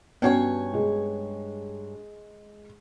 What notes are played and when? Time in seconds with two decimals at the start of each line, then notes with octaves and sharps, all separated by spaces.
0.22 G2 B3 C#4 F#4 C#5 G#5
0.74 G#3